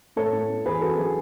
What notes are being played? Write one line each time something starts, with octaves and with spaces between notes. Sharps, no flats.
A2 A4 C#5
A2
B3
E2 G#4 B4
E2 F#4 A4
F#3 G#4